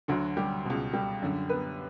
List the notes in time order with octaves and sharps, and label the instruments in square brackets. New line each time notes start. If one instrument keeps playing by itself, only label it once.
[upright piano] D2 D3 F#3 F#4
G3 G4
C#2 B2
G3 G4
F#2 D3
B3 B4